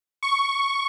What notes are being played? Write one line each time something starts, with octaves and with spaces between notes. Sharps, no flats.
C#6